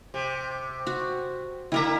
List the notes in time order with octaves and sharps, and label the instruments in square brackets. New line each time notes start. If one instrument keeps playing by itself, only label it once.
[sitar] C3
[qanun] F#4
[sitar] D3 A#3 E5 [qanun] E4 A#4 A#5